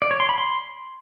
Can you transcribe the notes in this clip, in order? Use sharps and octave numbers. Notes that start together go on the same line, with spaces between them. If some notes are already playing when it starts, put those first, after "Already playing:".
D5
C#5
C6
B5
C6